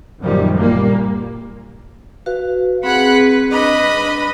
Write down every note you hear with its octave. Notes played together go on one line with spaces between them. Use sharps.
F#2 A#2 D#3 F3 G3
F#1 A#2 G3 A#3
F#4 B4 F5
C4 G#4 F#5 B5 F#6
B4
D4 B4 D#5 B5